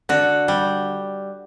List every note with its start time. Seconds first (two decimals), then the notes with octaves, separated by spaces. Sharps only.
0.09 D3 F#4
0.48 G3